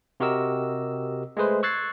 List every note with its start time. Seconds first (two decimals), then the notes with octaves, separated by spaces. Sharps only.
0.20 C3 F#4 G4 A#4 D#5 E6
1.37 G#3 A3 G#4 B4 C5
1.63 C#6 E6 F#6 G#6 A6 C7